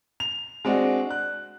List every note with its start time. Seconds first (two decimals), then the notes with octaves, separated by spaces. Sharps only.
0.20 F7
0.65 G#3 C4 D4 F#4
1.10 F#6